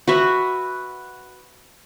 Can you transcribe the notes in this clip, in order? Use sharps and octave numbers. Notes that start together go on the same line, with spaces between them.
F#4 B4 E5